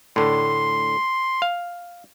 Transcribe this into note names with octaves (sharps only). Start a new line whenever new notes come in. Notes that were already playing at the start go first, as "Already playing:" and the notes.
A2 D3 C6
F5